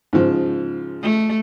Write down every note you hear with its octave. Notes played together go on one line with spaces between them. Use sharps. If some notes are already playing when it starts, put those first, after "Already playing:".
G#2 C#3 F3
A3